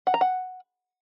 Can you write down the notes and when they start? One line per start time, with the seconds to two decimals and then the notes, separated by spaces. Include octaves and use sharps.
0.07 F#5
0.14 A#5
0.21 F#5